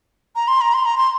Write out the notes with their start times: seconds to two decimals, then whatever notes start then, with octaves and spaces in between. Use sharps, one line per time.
0.36 A#5
0.48 C6
0.61 A#5
0.74 C6
0.85 A#5
0.98 C6